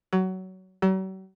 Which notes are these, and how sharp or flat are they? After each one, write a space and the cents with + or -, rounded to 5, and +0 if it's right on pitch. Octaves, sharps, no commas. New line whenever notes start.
F#3 +20
F#3 +45